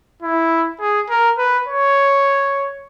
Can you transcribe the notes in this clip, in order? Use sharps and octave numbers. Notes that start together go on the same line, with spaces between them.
E4
G#4
A#4
B4
C#5